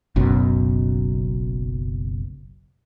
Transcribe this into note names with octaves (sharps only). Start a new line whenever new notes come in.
F#1 B1 F#2 B2